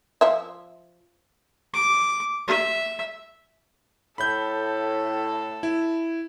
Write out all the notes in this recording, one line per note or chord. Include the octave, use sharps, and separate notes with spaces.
F3 E5
D6
E5
A2 A4 B5 G6
E4